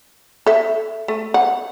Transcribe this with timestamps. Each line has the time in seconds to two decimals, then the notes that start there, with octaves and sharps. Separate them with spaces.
0.46 A4 E5
1.08 A3
1.34 F#5